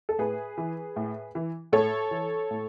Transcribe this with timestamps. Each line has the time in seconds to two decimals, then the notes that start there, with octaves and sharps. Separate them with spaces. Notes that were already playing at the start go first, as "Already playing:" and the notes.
0.09 A4
0.19 A2 G#4 B4
0.58 E3
0.96 A2
1.35 E3
1.73 A2 A4 C#5
2.11 E3
2.51 A2